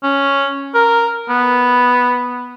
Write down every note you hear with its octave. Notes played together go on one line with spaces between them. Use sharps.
C#4
A#4
B3